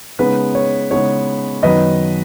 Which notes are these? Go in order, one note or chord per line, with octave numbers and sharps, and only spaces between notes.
C#3 G#3 B3 D#4 B4
C#5
C#3 G#3 B3 D#4 C#5
F#2 D#3 F#3 B3 D#4 B4 D#5